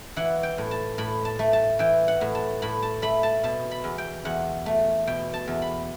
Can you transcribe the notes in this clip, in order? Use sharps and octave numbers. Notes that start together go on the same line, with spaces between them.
E3 F#5
G5
A2
A5
A2 B5
A5
A3
A5
E3 G5
F#5
A2
A5
A2 B5
A5
A3 B5
A5
B2 A5
B5
E2
G5
E2 F#5
A3
B2 G5
A5
E2
B5